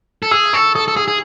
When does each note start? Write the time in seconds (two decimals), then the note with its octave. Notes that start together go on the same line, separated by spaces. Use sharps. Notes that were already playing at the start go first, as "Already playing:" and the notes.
0.23 A4
0.31 G#4 E6
0.53 A4 C#6
0.75 A4 D#6
0.88 A4
0.96 G#4 E6
1.08 G#4